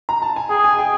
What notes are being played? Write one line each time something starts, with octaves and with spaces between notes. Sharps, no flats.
A#5
A5
G#5
G#4 G5
G#5
G5